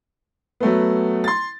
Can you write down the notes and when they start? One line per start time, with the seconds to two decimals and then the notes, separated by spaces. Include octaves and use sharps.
0.60 F#3 A3 B3
1.24 C6 A6